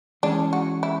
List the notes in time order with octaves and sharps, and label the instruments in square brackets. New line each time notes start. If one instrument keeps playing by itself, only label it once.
[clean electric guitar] E3 G#3 C#4 G#4 [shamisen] D4
[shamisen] F#4
E4